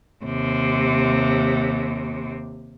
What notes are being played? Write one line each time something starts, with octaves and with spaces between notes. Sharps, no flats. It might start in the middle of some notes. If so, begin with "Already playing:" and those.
D#2 C3